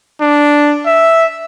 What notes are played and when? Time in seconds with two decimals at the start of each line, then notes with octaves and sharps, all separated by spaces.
0.21 D4
0.86 E5